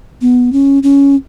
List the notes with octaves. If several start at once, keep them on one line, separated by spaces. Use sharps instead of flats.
B3
C#4
C#4